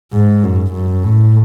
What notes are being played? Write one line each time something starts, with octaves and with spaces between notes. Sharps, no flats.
G#2
F#2
F#2
A2